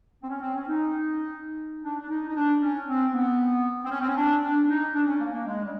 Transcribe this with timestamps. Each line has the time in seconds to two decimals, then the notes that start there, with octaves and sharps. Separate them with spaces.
0.22 C4
0.28 C#4
0.41 C4
0.55 C#4
0.68 D#4
1.84 D4
2.00 D4
2.10 D#4
2.29 D#4
2.36 D4
2.62 C#4
2.87 C4
3.13 B3
3.85 C4
3.90 C#4
4.00 C4
4.08 C#4
4.17 D4
4.42 D4
4.68 D#4
4.94 D4
5.06 C#4
5.20 A#3
5.33 A#3
5.45 G#3
5.64 G3